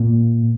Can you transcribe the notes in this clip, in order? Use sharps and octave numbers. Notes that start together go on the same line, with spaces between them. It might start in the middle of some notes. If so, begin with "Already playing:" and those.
Already playing: A#2 A#3